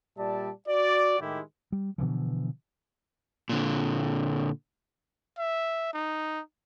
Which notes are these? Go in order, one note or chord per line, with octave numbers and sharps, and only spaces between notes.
A#2 G3 D5 E5 A5
F#4 D5
A2 D#3 G#3 E4 G4
G3
B2 D3 E3 F3
A#2 D3
E5
D#4